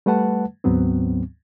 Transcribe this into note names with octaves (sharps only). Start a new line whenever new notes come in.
G3 A3 B4 F#5 A5
D2 G#2 F#3 B3 C4